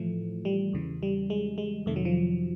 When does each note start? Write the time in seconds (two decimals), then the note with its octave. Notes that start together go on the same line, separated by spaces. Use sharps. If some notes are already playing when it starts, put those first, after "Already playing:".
Already playing: A2 E3 F3 A3
0.45 G3
0.73 E2 C#3 E3
1.03 G3
1.30 G#3
1.58 G#3
1.86 F2 C3 D#3 A3
1.96 F#3
2.05 F3